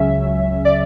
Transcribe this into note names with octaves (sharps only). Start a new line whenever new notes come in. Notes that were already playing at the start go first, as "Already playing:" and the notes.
Already playing: C#2 C#3 F#3 C#4 E5
D5